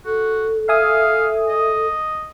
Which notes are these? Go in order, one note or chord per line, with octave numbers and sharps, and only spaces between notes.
F#4 A4
E5 F5 G#5 D#6
D#5